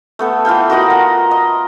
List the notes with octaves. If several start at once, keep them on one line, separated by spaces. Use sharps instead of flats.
A3 B3 A4
E3 F4 F5 G5
F#4 A#4 D#5 F#5
F4
D#5